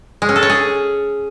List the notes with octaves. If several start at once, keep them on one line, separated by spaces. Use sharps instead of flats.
G#3
C#4
A4
C#5
G#4